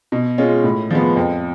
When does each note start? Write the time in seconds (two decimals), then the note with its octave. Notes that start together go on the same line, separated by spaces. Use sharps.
0.12 B2
0.38 G#3 C#4 F4
0.64 A2
0.91 F3 G#3 B3
1.17 F2